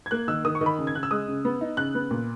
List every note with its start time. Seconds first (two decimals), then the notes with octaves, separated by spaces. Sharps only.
0.06 G#6
0.11 A#3 F#6
0.28 D#3 E6
0.45 D#3 D#6
0.55 C#6
0.61 D#3
0.66 B5
0.78 C#3
0.87 G#6
0.94 C#3 F#6
1.03 E6
1.11 G#3 D#6
1.28 C#3
1.45 B3
1.61 D#4
1.77 C#3 F#6
1.95 B3
2.11 A#2